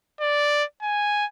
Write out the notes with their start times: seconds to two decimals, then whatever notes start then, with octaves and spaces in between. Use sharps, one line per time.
0.21 D5
0.82 G#5